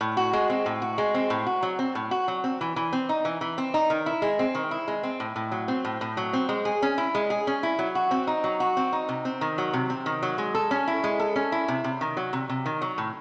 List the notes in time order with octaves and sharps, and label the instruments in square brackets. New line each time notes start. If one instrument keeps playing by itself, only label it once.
[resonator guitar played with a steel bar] A2
F#4
G#3
C4
A2
F#4
G#3
C4
A2
F#4
F#3
C4
A2
F#4
F#3
C4
E3
E3
C4
D#4
E3
E3
C4
D#4
D#3
E4
G#3
C4
D#3
E4
G#3
C4
A2
A2
F#3
C4
A2
A2
F#3
C4
G#3
G#4
C#4
E4
G#3
G#4
C#4
E4
F#3
F#4
C4
D#4
F#3
F#4
C4
D#4
C3
C4
D#3
F#3
C3
C4
D#3
F#3
G#3
A4
C#4
E4
G#3
A4
C#4
E4
C3
C3
D#3
F#3
C3
C3
D#3
F#3
A2